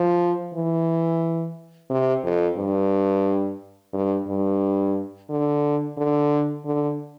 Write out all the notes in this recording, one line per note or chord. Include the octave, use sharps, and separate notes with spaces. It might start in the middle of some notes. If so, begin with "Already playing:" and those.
Already playing: F3
E3
C3
F2
G2
G2
G2
D3
D3
D3